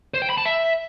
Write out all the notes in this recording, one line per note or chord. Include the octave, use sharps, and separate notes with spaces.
C5
G5
B5
A5
E5